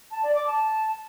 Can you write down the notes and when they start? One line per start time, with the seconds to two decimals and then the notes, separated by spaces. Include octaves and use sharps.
0.11 A5
0.23 D5
0.35 D6
0.47 A5